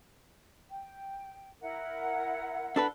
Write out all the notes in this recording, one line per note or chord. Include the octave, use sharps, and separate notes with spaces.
G5
E4 A#4 F#5
D4 A4 B4